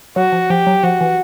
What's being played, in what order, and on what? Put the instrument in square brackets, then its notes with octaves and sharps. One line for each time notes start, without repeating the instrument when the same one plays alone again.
[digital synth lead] F#3 [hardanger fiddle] F#4
[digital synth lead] F3
[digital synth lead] F3 [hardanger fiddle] G4
[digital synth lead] F#3
[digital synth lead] F3 [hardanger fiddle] F#4
[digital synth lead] E3